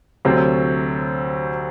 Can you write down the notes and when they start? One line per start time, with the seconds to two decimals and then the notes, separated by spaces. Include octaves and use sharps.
0.25 D2 C3 F#3 C4